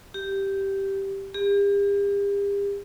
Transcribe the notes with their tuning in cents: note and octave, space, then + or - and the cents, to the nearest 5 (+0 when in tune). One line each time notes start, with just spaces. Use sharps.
G4 -5
G4 +40